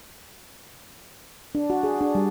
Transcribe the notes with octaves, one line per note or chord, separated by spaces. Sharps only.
D4
F#4
G#4
D4
G3